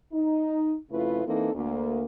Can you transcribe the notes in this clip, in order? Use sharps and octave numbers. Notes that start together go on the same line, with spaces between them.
D#4
F2 C#3 A3 E4 F4 B4
E3 A#3 C4 D#4 A4
D2 A#3